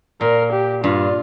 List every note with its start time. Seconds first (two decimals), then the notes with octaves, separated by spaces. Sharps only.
0.21 A#2 A#4
0.52 G4
0.84 G2 F4